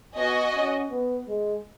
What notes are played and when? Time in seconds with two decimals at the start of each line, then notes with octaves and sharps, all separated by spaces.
0.16 B3 F#4 D#5 G#5
0.54 C#4
0.90 B3
1.27 G#3